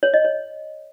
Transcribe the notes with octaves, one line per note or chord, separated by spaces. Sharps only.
C#5
D#5
C#5